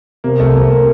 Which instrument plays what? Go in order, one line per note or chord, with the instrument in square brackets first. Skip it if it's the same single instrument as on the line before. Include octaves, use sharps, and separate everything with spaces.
[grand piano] C3 [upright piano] A#3
[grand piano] C2 [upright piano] A3
[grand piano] C3 [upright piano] A#3
[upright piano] A#3